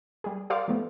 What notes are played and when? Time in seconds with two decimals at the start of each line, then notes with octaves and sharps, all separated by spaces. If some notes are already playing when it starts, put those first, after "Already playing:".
0.24 G3 G#4
0.50 G4 A#4 D5 F5 C6 D6
0.68 F3 A3 B3